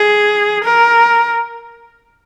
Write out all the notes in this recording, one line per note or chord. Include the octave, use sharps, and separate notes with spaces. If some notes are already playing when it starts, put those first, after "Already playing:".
Already playing: G#4
A#4